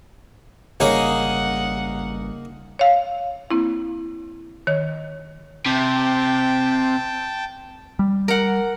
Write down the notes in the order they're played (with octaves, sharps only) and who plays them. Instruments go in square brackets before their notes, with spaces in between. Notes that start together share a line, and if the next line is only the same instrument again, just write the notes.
[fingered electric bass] G#1 C#3 G3 [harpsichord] A#3 D#4 G#4 [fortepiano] C#5 [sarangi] F#5
[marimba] C#5 F5
A#3 C4 E4
D#3 C#5
[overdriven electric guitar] C3 [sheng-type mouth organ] G5 A5
[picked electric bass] G3
[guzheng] A#4 F#5